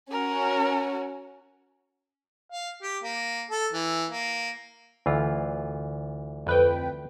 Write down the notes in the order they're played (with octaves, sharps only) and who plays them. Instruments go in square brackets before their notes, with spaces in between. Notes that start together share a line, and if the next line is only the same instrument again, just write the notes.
[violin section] C#4 F#4 [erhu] A#4
[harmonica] F5
G4
A#3
A4
E3
A#3
[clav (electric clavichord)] D2 E3 F4
[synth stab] F2 B4 G5